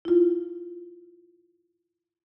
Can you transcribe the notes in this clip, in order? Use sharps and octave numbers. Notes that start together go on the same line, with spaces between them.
E4 F4